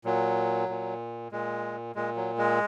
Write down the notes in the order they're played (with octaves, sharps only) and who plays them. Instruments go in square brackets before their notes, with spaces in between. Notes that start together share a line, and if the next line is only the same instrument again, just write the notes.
[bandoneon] A#2 F#3
A#2
A#2 G#3
A#2 G#3
F#3
G#3